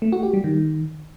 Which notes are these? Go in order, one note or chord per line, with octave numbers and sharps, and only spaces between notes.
A3
F#4
G4
G3
D#3